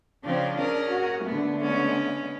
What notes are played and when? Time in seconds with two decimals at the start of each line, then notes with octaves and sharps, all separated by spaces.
0.24 C#3 F3 C4 D4
0.58 C#4 G#4 A#4
0.90 F#4
1.24 D3 A3 B3
1.61 G#3 B3 C#4